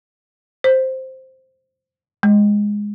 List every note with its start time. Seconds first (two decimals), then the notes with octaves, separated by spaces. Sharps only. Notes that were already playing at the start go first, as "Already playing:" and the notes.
0.64 C5
2.23 G#3